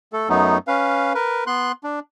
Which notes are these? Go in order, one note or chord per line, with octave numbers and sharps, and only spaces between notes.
A3 A4
F#2 F#3 A3 B3 D#4
C#4 B4 F5
A#4 B4
B3 C6 F#6
D4